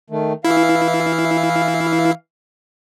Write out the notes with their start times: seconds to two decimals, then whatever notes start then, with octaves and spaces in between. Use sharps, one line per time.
0.10 D#3 A3
0.45 E3 E4 F5